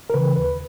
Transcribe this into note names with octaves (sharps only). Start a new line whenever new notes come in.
A#4
C#3 E3 B4
D#2 B4